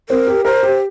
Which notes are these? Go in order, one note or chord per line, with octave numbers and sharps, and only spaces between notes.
C4 A#4
G4
A#4 C5
G4